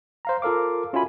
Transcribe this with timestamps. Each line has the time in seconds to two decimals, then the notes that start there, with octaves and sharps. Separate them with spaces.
0.25 C5 F5 A#5
0.42 F4 A4 A#4 F5 D6
0.93 C#4 F4 F#4 E5 G#5 B5